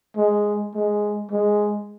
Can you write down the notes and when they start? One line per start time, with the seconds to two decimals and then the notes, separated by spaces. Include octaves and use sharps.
0.17 G#3
0.75 G#3
1.31 G#3